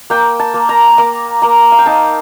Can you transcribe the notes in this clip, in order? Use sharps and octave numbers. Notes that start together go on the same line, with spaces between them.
A#3 G5
A5
A#3
A#5
A#3 D6
A#3 A#5
F5
G5
D#4 A5